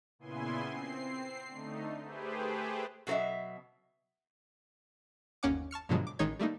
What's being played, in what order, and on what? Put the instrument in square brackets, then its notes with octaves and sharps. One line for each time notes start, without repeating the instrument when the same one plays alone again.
[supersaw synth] A#2 C#3 B3 E4 G#5 C6
C4 C7
D3 A3 D#4
A3 G4 G#4 B4 C5
[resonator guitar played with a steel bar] B2 F#3 A4 D#5 E5
[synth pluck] G1 D#2 A#3 C#4 F#5 D6
A5 C#6 F6 C#7
G2 B2 D3 F3 F#3 G#3
D6
A1 D#3 G#3 D#4 C#5 G#6
G3 A3 A#3 D#4